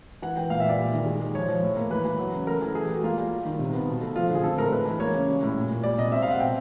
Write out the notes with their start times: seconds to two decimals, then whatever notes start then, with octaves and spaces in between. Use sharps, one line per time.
0.22 E3 F#5
0.37 E3 G5
0.50 A#2 F5
0.60 E5
0.65 A#2 D5
0.78 G3
0.92 D#3
1.06 G#3
1.20 G#3
1.35 F3 C#5
1.48 F3
1.63 A2
1.76 A#3
1.90 E3 B4
2.05 E3
2.19 F#3
2.33 C#3
2.47 A3 A#4
2.62 E3
2.75 A3 G#4
2.85 G4
2.89 A3
2.94 F#4
3.03 A#3 F4
3.17 G3
3.31 G3
3.45 D#3
3.59 C3
3.73 B3
3.88 B2
4.01 A3
4.16 F3 F4
4.30 D3
4.35 G#4
4.43 C4 A4
4.58 A2 A#4
4.72 G#3 B4
4.85 E3
5.00 A#3 C#5
5.14 C#3
5.28 G3
5.42 A2
5.56 A#2
5.71 A#2
5.84 G3 D5
5.98 C3 D#5
6.12 C4 E5
6.22 F5
6.27 C4 F#5
6.40 B2 G5